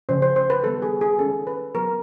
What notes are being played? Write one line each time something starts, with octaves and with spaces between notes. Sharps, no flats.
C#3 F3 A3 C#4 C5
C5
C5
B4
D#3 G3 B3 A4
G#4
G#4
D#3 G#3 C#4 A4
B4
F#3 B3 A#4